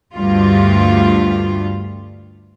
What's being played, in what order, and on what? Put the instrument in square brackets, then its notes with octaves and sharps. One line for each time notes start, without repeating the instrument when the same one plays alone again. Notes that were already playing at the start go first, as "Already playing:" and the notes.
[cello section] D2 G2 G3 F4